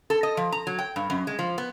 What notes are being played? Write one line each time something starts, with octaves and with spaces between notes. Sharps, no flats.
A4
D#5
F3
A#5
F#3
G5
G2
F#2
G#3
F3
B3